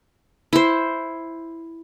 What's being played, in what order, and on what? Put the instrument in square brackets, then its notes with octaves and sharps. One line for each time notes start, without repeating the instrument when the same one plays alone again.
[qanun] E4 C5